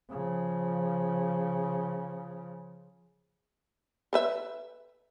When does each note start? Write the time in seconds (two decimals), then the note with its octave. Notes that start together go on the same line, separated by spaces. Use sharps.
0.10 C#3 F3
4.13 A4 B4 E5